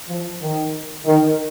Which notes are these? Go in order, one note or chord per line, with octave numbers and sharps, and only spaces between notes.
F3
D#3
D#3